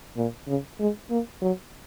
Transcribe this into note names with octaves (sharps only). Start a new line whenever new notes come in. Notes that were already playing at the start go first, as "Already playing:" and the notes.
A#2
C#3
G#3
A#3
F#3